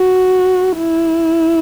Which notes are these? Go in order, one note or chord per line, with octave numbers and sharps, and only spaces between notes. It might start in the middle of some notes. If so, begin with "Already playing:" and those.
Already playing: F#4
E4